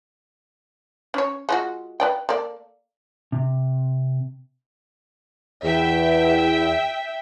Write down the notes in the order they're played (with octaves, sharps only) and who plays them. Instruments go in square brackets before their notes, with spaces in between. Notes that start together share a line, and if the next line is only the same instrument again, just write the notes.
[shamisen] C#4 C#5
G#3 F4 F#4
B4 D5 G5
A#3 A4 D5
[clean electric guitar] C3
[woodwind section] E2 [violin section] E5 G5